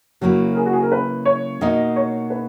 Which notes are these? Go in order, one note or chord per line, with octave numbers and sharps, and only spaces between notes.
C#3 F#3 A#3 E4 F#4
A#4
G#4
F#4
G#4
A#4
B4
C#5
B2 A#3 D#4 D#5
C#5
B4